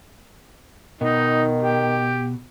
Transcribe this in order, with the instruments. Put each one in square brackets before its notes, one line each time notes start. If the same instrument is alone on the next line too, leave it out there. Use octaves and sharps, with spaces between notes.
[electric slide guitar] B2 [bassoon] D#3 [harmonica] D#4
[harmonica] G4